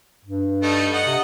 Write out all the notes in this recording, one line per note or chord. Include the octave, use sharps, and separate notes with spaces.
G2
G3 A3 D#4
D#5 F#5
C3